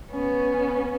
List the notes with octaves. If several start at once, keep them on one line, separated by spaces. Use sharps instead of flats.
B3 C#4